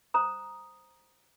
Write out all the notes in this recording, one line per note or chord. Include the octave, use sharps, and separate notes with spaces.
C5 A#5 D#6